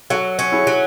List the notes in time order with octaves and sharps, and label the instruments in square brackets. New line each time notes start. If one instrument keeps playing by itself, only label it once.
[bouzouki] F#3 [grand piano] F#4 A4
[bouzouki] C#4
[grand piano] E4 G#4
[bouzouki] F#3